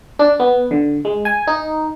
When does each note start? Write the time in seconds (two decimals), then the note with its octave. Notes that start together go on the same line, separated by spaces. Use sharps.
0.19 D4
0.40 B3
0.71 D3
1.05 G#3
1.25 G#5
1.47 D#4